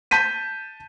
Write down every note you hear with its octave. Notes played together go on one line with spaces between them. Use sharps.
A5 G6 B6 D#7